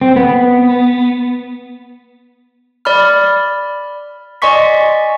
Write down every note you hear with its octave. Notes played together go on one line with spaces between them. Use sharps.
C4
B3
D5 B5 F6
D5 D#5 G#5 C6 C#6 B6